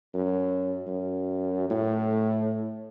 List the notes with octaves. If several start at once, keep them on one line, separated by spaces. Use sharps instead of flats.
F#2
F#2
A2